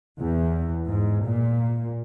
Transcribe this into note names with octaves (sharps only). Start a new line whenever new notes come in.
E2
G#2
A#2